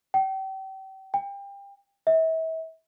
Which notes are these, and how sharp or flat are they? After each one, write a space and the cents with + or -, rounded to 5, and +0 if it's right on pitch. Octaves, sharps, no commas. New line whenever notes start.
G5 -35
G5 +30
E5 -35